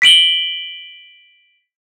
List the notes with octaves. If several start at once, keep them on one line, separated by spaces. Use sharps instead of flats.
B6 D7 F#7 G7